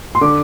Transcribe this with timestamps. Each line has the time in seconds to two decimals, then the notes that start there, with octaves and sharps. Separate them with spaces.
0.15 C6
0.21 D3 D6